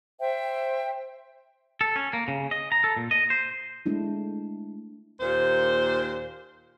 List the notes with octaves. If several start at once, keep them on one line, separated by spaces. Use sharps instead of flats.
C5 E5 G5
A4
C#4
A#3
C#3
D#5
A#5
A4
A#2
D#5
C5
G#3 A3 D4 E4
D#2 A#2 C5